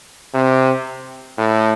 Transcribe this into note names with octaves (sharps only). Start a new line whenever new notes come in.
C3
A2